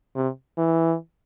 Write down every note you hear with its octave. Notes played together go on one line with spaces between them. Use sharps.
C3
E3